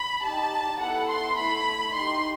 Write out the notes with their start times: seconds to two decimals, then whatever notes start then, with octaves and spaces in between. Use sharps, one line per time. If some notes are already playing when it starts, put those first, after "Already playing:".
Already playing: B5
0.23 D#4 G4 A5
0.80 B3 E4 A4 F#5
1.08 C6
1.36 A3 E4 A4 B5
1.94 D#4 G4 C6